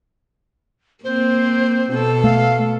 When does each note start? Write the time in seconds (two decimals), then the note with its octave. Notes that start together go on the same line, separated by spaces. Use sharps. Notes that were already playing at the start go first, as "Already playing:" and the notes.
1.04 A#3 C4 C5
1.90 B2 A4
2.24 A3 F5